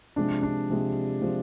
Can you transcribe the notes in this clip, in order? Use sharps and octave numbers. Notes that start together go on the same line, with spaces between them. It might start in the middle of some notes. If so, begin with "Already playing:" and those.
C3 F3 G#3 D4
D4
C3 F3 G#3
C3 F3 G#3